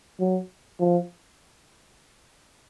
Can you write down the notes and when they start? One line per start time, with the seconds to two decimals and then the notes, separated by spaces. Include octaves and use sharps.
0.20 F#3
0.79 F3